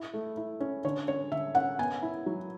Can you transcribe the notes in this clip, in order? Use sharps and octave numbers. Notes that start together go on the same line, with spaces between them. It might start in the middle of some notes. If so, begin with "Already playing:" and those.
Already playing: E4
A3
E4
C#4
D3 C#5
C#4 C#5
D3 E5
C#4 F#5
B3 G#5
E4
F#3